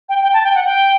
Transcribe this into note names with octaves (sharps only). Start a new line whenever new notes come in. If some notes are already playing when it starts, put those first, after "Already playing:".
G5
G5
A5
G5
F#5
G5